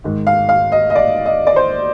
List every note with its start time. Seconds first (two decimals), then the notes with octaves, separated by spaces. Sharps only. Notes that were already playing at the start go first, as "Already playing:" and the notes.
0.04 G#2 D#3
0.27 F5
0.49 F5
0.72 D#5
0.90 D#5
0.96 D5
1.26 D#5
1.47 D5
1.56 C5